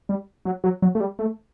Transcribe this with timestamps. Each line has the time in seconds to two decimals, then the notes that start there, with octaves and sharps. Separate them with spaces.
0.09 G3
0.45 F#3
0.64 F#3
0.82 F#3
0.95 A3
1.00 G3
1.19 A3